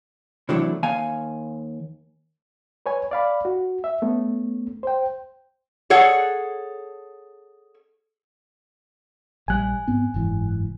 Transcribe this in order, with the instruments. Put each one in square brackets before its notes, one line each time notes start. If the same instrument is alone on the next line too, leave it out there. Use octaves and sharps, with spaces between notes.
[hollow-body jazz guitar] C3 E3 F#3 A3 D4 E4
D#2 F5 G#5
[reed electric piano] B4 C#5 G#5
D5 F5 B5
F#4
E5
A3 B3 C#4
C5 G5
[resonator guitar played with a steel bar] G#4 A4 C#5 F#5
[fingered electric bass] A#1 G3 [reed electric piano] G#5 F#6
[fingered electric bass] G#2 B3 C4
F#1 G#2 E3